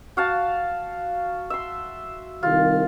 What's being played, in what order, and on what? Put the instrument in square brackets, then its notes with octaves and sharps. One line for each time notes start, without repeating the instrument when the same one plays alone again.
[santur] F#4 F5 A5
E5 C6
[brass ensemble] C2 D#3 [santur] F4